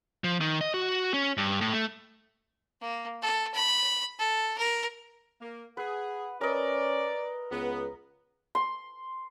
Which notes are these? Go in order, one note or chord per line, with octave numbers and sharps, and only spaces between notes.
F3
D#3
D#5
F#4
C#4
G2
A2
A3
A#3
A4
B5
A4
A#4
A#3
G#4 B4 F#5
C#4 A#4 B4 D5 D#5
C#2 B3
C6